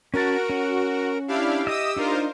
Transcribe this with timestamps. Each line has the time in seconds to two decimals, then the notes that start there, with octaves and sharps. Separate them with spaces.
0.14 C#4 F#4 A#4 A5
0.50 C#4
1.28 D4 E4 G4 F5
1.67 D#5 E5 D#6 E6
1.96 D4 D#4 F4 A#4 C5